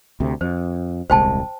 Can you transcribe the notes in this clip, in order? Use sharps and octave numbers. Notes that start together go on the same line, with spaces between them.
D2 C3
F2 C5
D#1 C2 G#3 C5 G5 A5